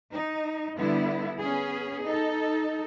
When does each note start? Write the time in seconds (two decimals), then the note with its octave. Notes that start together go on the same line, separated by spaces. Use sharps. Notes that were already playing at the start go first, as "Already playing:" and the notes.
0.12 D#4
0.77 D3 G3 B3 E4
1.40 B3 C#4 G#4
2.05 D#4 A4